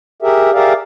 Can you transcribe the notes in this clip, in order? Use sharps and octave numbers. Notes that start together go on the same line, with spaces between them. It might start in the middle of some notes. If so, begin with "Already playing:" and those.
G4 G#4 A#4 E5
G4 G#4 A#4 D5 E5 F5